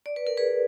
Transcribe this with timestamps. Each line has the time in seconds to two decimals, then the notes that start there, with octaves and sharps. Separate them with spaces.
0.06 D5
0.16 B4
0.27 A#4
0.37 G#4 B4